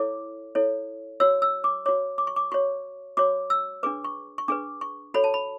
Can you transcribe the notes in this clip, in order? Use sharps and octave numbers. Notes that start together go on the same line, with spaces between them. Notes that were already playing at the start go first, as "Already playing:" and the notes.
Already playing: E4 A4 C#5 D6
E4 A4 C#5
F#4 C#5 E6
E6
D6
F#4 C#5 D6
D6
C#6
D6
F#4 C#5 C#6
F#4 C#5 D6
E6
D4 G#4 B4 D6
C#6
C#6
D4 G#4 B4 D6
C#6
F#4 A4 C#5 B5
A5
B5